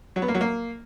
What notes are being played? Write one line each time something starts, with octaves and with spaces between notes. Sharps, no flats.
F#3
B3
A#3
F#3
A#3